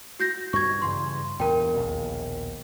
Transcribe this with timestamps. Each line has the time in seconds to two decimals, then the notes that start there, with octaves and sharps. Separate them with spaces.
0.20 F#4 G6 A#6
0.53 G2 C#6 G#6
0.82 G2 C#3 E3 C6
1.40 E2 G2 A#2 A#4 G5
1.74 A#1 D#2 B2